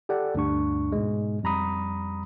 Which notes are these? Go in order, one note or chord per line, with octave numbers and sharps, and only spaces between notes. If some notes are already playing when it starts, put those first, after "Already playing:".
G4 A4 D5 F#5
D2 G2 D4 C#6
G#2 B2 G#3
F2 G3 A#5 B5 D#6